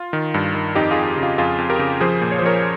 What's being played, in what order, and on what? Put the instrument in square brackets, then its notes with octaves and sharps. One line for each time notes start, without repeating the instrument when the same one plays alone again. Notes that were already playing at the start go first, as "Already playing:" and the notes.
Already playing: [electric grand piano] F4
D#3
G2
D#3
F2 D#4 G4
F2 F4 G#4
C#3
F4
F2 F4 G#4
F2
G4 A#4
C#3
F3 G#4 C5
A#2
C#5
C5
F3 A#4 C#5